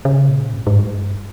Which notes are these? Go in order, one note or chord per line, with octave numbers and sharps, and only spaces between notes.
C#3
A#2
G2
G#2
G2